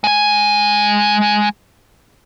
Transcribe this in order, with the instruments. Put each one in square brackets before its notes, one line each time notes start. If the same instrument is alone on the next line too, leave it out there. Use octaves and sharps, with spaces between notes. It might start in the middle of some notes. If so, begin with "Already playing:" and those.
[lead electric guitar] G#3 G#5